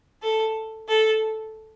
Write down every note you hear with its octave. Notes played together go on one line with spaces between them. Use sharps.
A4
A4